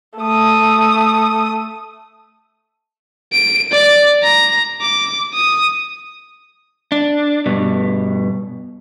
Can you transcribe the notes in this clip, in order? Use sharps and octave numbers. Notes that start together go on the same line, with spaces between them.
A3 D#6
D7
D5
A#5
D6
D#6
D4
G2 B2